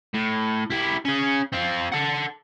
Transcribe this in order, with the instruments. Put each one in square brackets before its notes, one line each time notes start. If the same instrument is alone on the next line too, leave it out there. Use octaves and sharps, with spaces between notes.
[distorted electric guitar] A2
E4 G4
C#4 G#4
C4 F4
A4 F#5